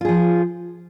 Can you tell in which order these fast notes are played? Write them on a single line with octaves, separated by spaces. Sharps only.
F4 G#4 F3